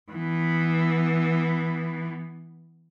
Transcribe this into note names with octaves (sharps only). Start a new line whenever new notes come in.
E3 B3